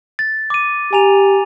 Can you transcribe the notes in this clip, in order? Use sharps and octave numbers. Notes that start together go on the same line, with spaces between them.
A6
D6 D#7
G4 G#5 A#5 F7